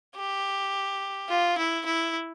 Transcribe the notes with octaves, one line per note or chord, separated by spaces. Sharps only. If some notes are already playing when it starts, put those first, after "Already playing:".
G4
F4
E4
E4